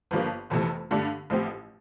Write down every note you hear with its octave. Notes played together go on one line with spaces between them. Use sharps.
G1 G2 F3 A#3
F1 F2 C3 E3 A3
G2 D3 A3 D4 A4
A1 A2 F3 C4 G4